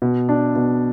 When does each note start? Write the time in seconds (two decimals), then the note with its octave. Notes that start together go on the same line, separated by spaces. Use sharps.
0.02 B2
0.29 D4
0.56 B2